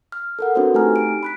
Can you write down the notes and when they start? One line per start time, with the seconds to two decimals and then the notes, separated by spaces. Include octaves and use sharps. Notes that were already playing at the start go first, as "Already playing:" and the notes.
0.12 F6
0.39 A4 A#4 F#5
0.55 C4 D4 F#4 A4 B4 C5
0.74 A3 D#4 G4 G#5 A#5 F6
0.96 D7
1.23 B5 F#6 B6